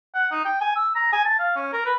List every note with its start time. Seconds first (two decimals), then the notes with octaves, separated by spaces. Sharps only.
0.14 F#5
0.31 D#4
0.45 G5
0.61 G#5
0.76 E6
0.95 A#5
1.12 G#5
1.25 A5
1.39 F5
1.56 C#4
1.73 A#4
1.85 B4